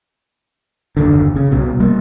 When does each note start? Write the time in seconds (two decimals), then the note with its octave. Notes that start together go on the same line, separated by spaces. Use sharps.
0.97 F#1 D#2 D3
1.36 C#3
1.51 C2 B2
1.80 G3 A#3